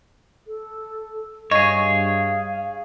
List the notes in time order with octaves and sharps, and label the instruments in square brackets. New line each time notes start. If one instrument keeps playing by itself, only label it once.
[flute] A4
[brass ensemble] G2 [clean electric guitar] G#4 C#5 [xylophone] D#5 C#6 [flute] F5